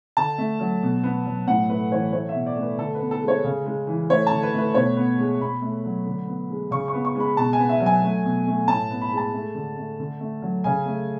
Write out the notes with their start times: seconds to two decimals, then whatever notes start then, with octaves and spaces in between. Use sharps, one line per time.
0.17 D3 A5
0.38 A3
0.60 F#3
0.83 B2
1.03 B3
1.26 F#3
1.47 A2 F#5
1.69 A3 B4
1.91 E3 C#5
2.12 A3 C#5
2.29 E5
2.34 B2
2.46 D5
2.56 A3
2.62 B4
2.78 D3 A4
2.95 B4
3.00 B3
3.11 A4
3.22 G#3
3.28 C#5
3.44 C#3
3.66 G#3
3.87 E3
4.10 A3 C#5
4.27 D3 A5
4.43 B4
4.54 A3 B4
4.74 B2 C#5
4.97 B3
5.18 G#3
5.40 B2 B5
5.62 A3
5.85 F#3
6.06 D3
6.27 B3
6.50 G#3
6.71 C#3 C#6
6.88 C#6
6.93 B3
7.05 C#6
7.15 G#3 B5
7.37 B2 A5
7.53 G#5
7.59 B3
7.69 E5
7.80 F#3
7.86 G#5
8.02 A3
8.25 B2
8.47 A3
8.68 A2 A5
8.91 B3
9.01 B5
9.11 G#3
9.17 A5
9.33 A3
9.55 D3
9.78 A3
10.00 D3
10.20 A3
10.42 F#3
10.64 C#3 G#5
10.86 A3